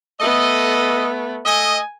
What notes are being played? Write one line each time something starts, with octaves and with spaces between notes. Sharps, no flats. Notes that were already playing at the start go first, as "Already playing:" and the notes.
A3 B3 A4 D#5
A3 D#5 G#5